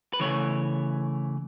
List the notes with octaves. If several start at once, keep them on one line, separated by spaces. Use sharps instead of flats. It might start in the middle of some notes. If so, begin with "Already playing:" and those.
B4
C#3 E3 A3 C#5